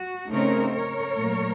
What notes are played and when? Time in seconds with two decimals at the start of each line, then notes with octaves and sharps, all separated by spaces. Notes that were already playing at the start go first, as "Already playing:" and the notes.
Already playing: F#4
0.31 C#3 A3 C4 D#4 A#4 C#5
0.73 A#4 C#5
1.16 A#2 F#3 A3